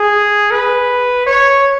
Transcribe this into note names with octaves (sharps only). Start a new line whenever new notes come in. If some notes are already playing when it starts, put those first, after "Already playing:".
Already playing: G#4
B4
C#5